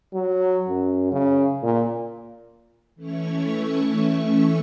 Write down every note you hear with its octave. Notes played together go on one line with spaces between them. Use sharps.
F#3
F#2
C#3
A#2
E3 A3 C#4 E4 C#5 C#6